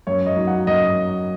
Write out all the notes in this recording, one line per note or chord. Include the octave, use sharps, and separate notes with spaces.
F#2 C#5
D#5
F#3 D#4
F#5
F#2 D#5